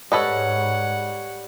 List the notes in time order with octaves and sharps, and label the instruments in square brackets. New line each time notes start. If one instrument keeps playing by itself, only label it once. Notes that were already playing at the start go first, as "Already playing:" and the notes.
[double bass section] G#2 [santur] G3 G4 C#5 [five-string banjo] A4 B4 D#5 [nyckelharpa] F#5